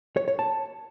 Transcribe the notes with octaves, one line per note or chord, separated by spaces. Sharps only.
C#5
C#5
A5